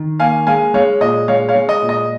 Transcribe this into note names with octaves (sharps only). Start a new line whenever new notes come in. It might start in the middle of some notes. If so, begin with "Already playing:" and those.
Already playing: D#3
A#3 F5 G#5
G#3 F5 G#5
G#3 C#5 F5
A#2 D#5
G#3 C#5 F5
C#5 F5
G#3
D#5
A#2
D#5